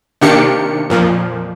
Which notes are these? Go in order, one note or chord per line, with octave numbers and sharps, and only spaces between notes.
C3 D#3 A#3 D4 G4 C#7
F2 A#2 F3